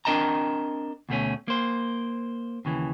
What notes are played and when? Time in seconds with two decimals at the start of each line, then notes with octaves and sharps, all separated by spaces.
0.05 C4 D4 A#4 D#5 A5 A#5
1.09 D2 B2 A3 C#4
1.48 A#3 C5
2.65 D#2 C#3 E3